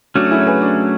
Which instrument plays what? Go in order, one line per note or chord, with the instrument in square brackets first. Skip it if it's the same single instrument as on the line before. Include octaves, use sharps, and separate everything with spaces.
[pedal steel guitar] F#3 A3 C#4 [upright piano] D4 F#4
[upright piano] E4 G#4
C#5
G#4 B4
D4